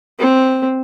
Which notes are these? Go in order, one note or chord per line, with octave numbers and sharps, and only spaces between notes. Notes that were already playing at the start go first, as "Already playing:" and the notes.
C4